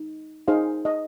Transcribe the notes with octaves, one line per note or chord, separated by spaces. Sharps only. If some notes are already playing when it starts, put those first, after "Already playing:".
Already playing: D#4
D#4 G#4 C5 F5
D#5